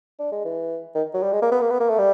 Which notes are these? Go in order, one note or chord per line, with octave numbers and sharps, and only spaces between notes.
D4
G#3
E3
D#3
F#3
G3
G#3
A#3
B3
A#3
B3
A#3
A3
G3